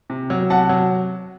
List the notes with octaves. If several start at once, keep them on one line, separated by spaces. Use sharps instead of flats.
C3
F#3
C3 F#5 A5
F#3